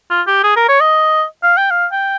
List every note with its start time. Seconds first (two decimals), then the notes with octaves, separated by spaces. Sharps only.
0.10 F4
0.27 G4
0.44 G#4
0.56 A#4
0.69 C#5
0.80 D#5
1.43 F5
1.57 G5
1.71 F5
1.92 G5